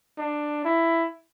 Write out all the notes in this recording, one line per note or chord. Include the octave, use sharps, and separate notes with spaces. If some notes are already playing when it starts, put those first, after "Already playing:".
D4
E4